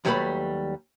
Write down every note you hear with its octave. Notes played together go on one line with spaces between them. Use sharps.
D#2 F#3 G3 A3 B4 B5